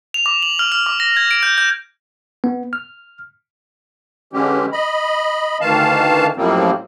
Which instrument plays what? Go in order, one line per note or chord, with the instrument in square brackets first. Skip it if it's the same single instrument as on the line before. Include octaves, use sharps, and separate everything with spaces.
[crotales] F7
D6
F#7
F6
F6
D6
A#6
G#6
D7
G6
G6
[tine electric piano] B3
F6
[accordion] D3 E3 G#3 C#4 G4
D#5 B5
D2 D#3 E3 F5 A5
F#2 A2 F3 G3 A#3 C4